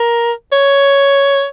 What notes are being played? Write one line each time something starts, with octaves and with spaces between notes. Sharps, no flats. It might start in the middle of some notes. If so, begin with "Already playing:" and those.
Already playing: A#4
C#5